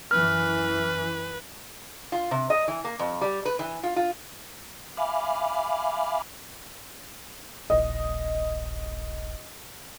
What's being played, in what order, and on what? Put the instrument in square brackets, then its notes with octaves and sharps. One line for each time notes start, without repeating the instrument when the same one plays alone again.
[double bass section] F#2 E3 [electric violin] B4 [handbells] F6
[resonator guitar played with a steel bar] F4
C3
D#5
E3
A#3
F2
G3
B4
E3
F4
F4
[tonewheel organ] E5 F5 G#5 B5 D6 F6
[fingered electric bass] D#1 A#1 [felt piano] D#5